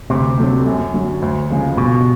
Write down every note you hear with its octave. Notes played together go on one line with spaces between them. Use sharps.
D2 C3
D3 F#3 A3 C4
F#2
D3 F#3
D2
C#3 F3 G#3
G2 B2